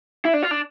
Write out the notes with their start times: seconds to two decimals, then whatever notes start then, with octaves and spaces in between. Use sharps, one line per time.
0.25 E4
0.34 D4
0.43 F4
0.51 D4